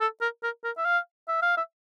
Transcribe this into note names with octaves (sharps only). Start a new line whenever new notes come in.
A4
A#4
A#4
A#4
E5
F5
E5
F5
E5